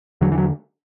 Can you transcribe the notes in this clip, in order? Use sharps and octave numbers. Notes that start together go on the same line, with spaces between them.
E2 D3 F#3
E3
F#3